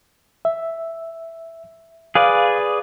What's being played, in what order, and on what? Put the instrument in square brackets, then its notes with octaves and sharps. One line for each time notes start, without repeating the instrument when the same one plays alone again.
[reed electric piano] E5
[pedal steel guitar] G#4 B4 D5 [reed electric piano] F5